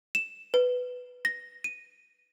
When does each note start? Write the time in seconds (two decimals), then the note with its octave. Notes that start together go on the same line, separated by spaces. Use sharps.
0.15 E7
0.54 B4
1.25 A#6
1.64 D#7